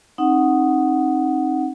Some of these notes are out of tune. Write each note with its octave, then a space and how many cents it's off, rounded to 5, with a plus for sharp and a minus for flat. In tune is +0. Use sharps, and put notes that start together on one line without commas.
C4 +40 D#4 +0 F#5 +0